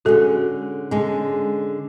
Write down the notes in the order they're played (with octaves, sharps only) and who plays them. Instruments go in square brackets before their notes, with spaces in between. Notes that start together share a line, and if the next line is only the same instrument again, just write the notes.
[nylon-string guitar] D3 G#3 C#4 [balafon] F#4 A4
[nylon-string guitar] D3 G#3 C#4